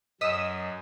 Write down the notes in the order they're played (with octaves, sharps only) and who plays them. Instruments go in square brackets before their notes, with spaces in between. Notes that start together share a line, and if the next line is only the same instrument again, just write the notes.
[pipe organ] F#2 [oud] D#5 [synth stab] D#6 E6 B6